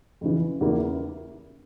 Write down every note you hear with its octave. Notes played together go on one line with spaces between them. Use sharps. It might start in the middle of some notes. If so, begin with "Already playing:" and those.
F2 C#3 E3
E2 C#3 E3 A#3 E4